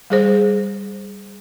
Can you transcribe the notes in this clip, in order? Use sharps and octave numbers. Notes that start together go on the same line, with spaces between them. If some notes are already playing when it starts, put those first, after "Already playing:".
G3 G#4 C5